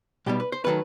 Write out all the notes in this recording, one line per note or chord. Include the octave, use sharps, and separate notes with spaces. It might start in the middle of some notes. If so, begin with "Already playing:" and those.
B1 B2 G3 G4
B4
C5
D#3 F#3 A3 B4